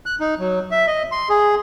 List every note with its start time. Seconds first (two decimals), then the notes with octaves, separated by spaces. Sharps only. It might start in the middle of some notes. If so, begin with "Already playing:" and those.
0.06 F#6
0.20 D#4
0.39 F#3
0.71 E5
0.87 D#5
1.12 C6
1.29 G#4